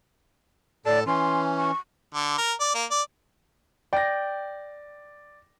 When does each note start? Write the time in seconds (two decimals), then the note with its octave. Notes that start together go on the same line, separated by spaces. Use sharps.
0.86 A2 A4 D5 A5
1.07 E3 C#4 C6
1.58 C#6
2.14 D3
2.38 A#4
2.60 D5
2.75 A#3
2.91 D5
3.93 D5 G5 A#6